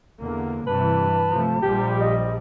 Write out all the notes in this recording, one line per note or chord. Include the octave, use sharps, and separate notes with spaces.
E2 D3 A#3
G2 C3 E3 B4 A5
C3 F3 A3
A#1 F3 G3 G4
D#5